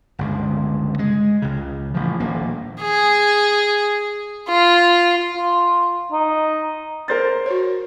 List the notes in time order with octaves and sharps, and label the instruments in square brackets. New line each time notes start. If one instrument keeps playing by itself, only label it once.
[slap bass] G1 C#2 G2
G#3
C#2 C#3
A1 F3
D#1 A#1 A#3
[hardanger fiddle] G#4
F4
[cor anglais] F4
D#4
[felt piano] A#4 C5 A6
[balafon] F#4 C#5